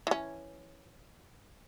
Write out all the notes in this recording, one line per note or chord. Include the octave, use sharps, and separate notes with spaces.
E3 C#4